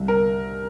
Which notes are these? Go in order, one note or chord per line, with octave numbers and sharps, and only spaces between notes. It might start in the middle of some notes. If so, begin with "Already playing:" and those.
Already playing: C2
A#4